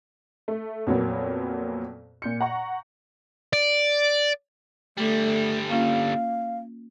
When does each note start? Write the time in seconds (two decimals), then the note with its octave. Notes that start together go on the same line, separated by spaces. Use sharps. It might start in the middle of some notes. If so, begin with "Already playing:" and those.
0.48 A3
0.87 F2 A#2 F#3 A#3 B3
2.22 A#2 G6 C#7
2.41 F#5 A#5 C#6
3.53 D5
4.98 D3 G3 A3
5.70 A#3 C#4 F4 F5